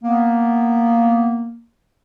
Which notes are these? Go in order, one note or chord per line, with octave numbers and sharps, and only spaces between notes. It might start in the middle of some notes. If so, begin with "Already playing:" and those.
A#3 B3